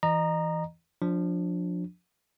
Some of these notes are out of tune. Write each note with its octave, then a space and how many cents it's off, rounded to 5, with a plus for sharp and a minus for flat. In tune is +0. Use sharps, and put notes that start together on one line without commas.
E3 +0 D#5 -30 A#5 +0
F3 +25 D4 +0